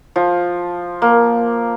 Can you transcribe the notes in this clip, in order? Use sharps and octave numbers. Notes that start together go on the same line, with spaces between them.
F3
A#3